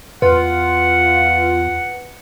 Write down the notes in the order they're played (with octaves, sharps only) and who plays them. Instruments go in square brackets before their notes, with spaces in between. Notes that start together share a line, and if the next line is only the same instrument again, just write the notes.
[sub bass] E2 [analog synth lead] F4 [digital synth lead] B4 [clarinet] F#5